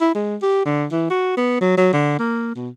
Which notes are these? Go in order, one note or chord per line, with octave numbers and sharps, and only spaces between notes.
E4
G#3
G4
D3
E3
F#4
B3
F#3
F#3
D3
A#3
B2